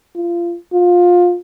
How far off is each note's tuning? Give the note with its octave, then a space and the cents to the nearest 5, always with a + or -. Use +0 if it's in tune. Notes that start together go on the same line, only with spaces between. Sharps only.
F4 -25
F4 +20